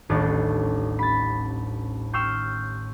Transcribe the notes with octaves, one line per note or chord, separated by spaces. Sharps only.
D#1 A1 A2 D4 A4
B5 A6
G5 C6 C#6 E6 F6 G6